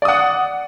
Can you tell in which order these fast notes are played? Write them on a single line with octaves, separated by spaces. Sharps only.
D5 D#6 F#5